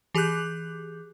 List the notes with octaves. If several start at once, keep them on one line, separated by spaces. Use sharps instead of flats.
E3 G4 G#4 D6 F#6 G6